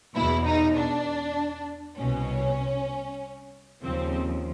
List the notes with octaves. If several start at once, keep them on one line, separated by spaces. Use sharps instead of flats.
E2 B2 E4
D#4
D4
C2 B2 C#4
D#2 C#3 F3 C4